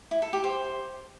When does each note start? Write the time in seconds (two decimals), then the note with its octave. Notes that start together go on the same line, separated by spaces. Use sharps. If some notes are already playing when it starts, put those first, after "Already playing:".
0.11 E4
0.22 A4
0.33 G4
0.44 C5